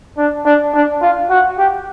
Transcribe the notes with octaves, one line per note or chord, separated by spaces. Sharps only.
D4
D4
D4
F4
F#4
G4